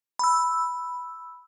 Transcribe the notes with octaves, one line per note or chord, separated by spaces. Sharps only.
B5 E6